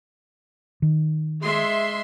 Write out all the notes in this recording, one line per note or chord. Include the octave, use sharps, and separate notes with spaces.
D#3
G#3 E5 C6